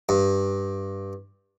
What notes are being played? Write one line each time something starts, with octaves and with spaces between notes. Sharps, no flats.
G2